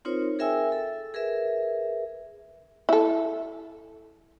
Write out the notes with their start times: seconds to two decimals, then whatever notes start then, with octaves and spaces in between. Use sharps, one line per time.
0.05 C4 D#4 F4 A#4 C5 C#5
0.39 G#4 A#4 E5 G5 G#5 E6
0.72 A4
1.14 G#4 A#4 B4 E5
2.89 E4 A4